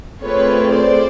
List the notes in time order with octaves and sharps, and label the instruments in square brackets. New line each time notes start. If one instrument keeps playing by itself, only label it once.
[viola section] A3 C4 F4 G#4 [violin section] B4 C#5
[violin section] C5 D5